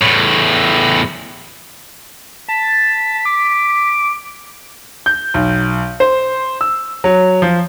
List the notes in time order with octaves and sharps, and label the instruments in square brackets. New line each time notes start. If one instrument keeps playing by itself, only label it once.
[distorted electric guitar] E2 A2
[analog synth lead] A5 [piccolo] B6
[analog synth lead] D6
[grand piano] G6
B1
C5
E6
F#3
F3